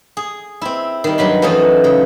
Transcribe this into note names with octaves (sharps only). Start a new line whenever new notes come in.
G#4
C4 E4
D#3 G3
G2 F#3 B5 C6
F#2 E3 F3 A3 C#4 D#4
C#3